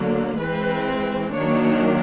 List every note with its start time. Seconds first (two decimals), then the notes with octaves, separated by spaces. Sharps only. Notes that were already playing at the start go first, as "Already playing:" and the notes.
Already playing: D3 F#3 A#3
0.39 E3 G#3 C4 B4
1.35 D#3 F#3 A#3 D4 C#5